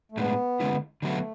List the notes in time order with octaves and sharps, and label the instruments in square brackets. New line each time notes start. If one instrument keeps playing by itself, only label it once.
[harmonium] A3
[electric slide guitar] A2 G#3 D4 [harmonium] B3
[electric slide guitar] D3 G#3 C#4 E4
[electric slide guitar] D3 F#3 B3 F#4 [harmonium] A3